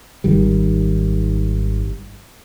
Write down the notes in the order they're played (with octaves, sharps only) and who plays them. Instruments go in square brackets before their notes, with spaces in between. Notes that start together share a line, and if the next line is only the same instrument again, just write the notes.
[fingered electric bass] G#1 D#3 G3